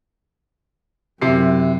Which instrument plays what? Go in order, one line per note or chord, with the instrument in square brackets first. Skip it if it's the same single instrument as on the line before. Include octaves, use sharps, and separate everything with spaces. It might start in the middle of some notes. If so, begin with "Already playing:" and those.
[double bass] F#2 [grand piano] C3 E4 C7